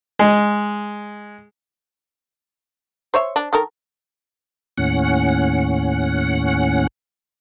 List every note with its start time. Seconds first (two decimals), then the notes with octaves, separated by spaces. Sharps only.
0.19 G#3
3.14 C5 C#5 E5
3.36 D4
3.53 D#3 A4 A#4
4.78 D#2 A2 C#4 F#5